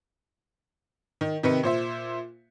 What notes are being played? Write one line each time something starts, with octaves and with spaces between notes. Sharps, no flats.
D#3
C3 D#3 B4 C#7
A#2 C5 E5